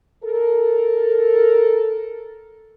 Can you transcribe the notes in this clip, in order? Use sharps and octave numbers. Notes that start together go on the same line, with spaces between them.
A4 A#4